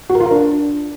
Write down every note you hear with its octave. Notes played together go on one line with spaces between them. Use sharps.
F#4
A#4
F4
A#4
D4